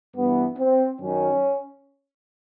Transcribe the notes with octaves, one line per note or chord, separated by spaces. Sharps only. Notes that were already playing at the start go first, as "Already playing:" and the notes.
G2 E3 B3
C4
F#2 D#3 C#4